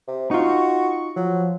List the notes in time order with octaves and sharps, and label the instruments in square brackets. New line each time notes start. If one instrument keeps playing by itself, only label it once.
[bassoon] C3
[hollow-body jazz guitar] D#4 F4 [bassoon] F#4 [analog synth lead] C#6
[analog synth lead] F3 [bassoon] F#3